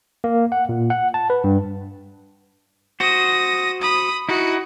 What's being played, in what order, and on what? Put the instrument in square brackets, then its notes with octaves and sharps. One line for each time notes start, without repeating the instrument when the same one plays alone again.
[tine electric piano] A#3
F#5
A#2
F#5
A5
B4
G2
[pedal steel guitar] F#4 C5 [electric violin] D#6 A#6
[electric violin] B5 D#6
[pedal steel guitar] D#4 E4 [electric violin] F#4